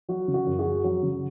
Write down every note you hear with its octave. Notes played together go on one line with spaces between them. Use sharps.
F#3 F#4
C#3
F#4
F#2
F#4 G#4
F#2
F#3 F#4
C#3